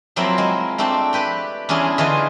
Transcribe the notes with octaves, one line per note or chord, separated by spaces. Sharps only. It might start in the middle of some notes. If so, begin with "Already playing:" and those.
F3 F#3 A#3 C4 E4
G#3 A#3
A3 C4 D4 A4 G5
G4 B4 G5
E2 C#4 D4 E4 G#4 C6
D3 E3 F4 G#4 D#5